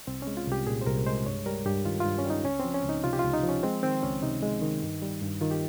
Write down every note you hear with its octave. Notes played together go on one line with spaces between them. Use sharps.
C2 C4
G#3 C#4
F4
C2 G4
A#2 G#4
C5
C2 A#4
G#3 C5
G2 C#5
G3 A#4
G2 G4
D#3 F4
G2 F4
C#4
G3 D#4
C#2 C#4
F3 C4
C#4
C#2 D#4
C3 F4
G4
C#2 F4
D#4
F3
C#4
G#3 C4
D#3 C4
C#2 C#4
C3 D#4
G#3
D#3
G2
G3
G2
D#3 F4
G4